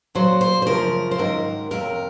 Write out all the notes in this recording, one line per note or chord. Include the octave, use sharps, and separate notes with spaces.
A#2 F#3 C5
C5
C5
F#2 C#3 F3 A#4
C5
G#2 D#3 F#3 A#4
F2 C3 F#3 A#4